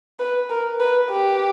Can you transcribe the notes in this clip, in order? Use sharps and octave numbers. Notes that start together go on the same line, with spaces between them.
B4
A#4
B4
G4